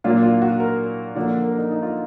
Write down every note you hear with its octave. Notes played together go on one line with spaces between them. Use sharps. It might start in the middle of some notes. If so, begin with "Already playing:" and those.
A#2 F#3 A#3 D4 F4
F4
F#4
A#4
D3 F3 A#3 D4 D5
A#4
D#4
D#4
F4